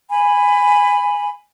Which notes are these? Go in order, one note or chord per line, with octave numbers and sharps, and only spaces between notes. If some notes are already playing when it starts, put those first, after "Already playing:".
G#5 B5